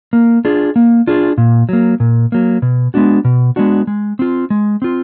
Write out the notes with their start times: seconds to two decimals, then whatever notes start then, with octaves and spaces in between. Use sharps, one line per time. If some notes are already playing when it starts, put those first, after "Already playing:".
0.13 A#3
0.45 D4 F4 G#4
0.76 A#3
1.07 D4 F4 G#4
1.38 A#2
1.69 F#3 A#3
2.00 A#2
2.32 F#3 A#3
2.62 B2
2.94 G#3 B3 D4 F#4
3.25 B2
3.56 G#3 B3 D4 F#4
3.87 G#3
4.19 C4 F4
4.50 G#3
4.82 C4 F4